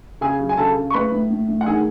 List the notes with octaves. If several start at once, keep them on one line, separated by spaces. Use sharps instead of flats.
C#3 G#4 G#5
F#3
G#5
C#3 A4 A5
C#3
C#6
A2 B4 B5
A2
A2
A2
F#5
D#3 G#4 G#5